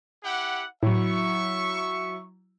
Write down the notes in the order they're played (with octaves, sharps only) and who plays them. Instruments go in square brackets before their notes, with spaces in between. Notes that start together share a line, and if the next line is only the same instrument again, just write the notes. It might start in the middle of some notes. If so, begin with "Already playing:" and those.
[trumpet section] E4 G4 F#5
[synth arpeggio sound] A2 [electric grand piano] F#3 E4 [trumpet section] E5 C#6